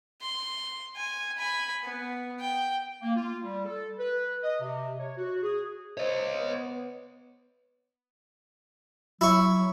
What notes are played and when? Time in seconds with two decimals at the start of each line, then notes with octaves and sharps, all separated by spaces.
0.22 C6
0.97 G#5
1.38 G#5 B5
1.84 B3
2.40 G5
3.02 A#3
3.15 F4
3.42 G3
3.65 A4
3.99 B4
4.42 D#5
4.61 C3
4.98 C#5
5.16 F#4
5.42 G#4
5.97 C5 C#5 D#5
6.36 B3
9.21 F#3 E4 C#6